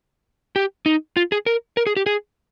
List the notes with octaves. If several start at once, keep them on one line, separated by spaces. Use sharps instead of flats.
G4
D#4
F4
G#4
A#4
A#4
G#4
G4
G#4